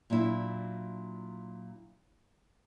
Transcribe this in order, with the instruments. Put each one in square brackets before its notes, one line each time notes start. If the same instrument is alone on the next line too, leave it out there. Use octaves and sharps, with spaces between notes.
[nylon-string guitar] A#2 F#3 D4 E4